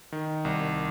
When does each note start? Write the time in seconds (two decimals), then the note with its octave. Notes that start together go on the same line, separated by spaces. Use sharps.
0.12 D#3
0.45 C2